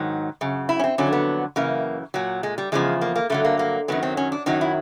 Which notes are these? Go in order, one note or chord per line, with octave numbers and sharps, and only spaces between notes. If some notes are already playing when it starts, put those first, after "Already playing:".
Already playing: G#2 D#3 F#3
F#2 C#3
E4
C#4
C4
F2 D3 F#3 C#4
B3
F#2 C#3 E3 A#3
A#2 F#3
G#3
G3
E2 C#3 F3 G#3
A#3
A#3
G2 D3 F#3 A3
A#3
A#3
F#2 D#3 F#3 B3
C4
C#4
D4
F#2 D#3 F#3 D#4
E4